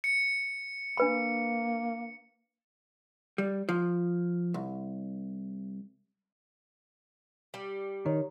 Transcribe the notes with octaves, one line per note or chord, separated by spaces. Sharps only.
C#7
A#3 D4 B4 B5
G3
F3
C2
G3
D#3 C#5